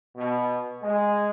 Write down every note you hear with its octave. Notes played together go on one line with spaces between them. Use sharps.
B2
G#3